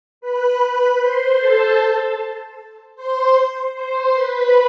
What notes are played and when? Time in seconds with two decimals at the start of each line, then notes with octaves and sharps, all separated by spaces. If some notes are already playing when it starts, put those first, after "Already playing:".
0.21 B4 B5
0.60 B4 B5
1.00 C5 C6
1.38 A4 A5
2.95 C5 C6
3.74 C5 C6
4.13 B4 B5